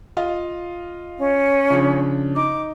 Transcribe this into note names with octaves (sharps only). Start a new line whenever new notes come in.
F4 D#5 F5
C#4
C#3 F3 D4
D#4 D6